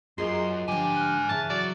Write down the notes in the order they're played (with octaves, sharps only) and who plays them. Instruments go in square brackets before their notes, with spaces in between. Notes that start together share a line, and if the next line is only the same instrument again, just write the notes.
[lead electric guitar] F#2 [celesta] F4 D#5 [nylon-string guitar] G#4 A#4 [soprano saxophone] C6
[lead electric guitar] G#2 G#5 [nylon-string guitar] D3 F3 [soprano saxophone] G4
[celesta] F6 F#6
[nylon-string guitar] C#3 E3 [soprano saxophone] A5
[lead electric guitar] F#3 F#4 [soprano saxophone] D5